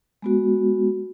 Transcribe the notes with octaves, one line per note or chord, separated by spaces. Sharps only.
G#3 B3 F#4